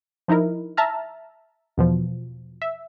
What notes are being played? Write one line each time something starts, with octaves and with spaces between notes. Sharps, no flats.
F3 D#4 E4 A#4
E5 A5 A#5 F6
E2 B2 F3
E5